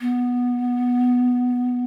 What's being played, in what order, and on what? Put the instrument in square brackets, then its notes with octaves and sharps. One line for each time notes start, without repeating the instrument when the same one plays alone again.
[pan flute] B3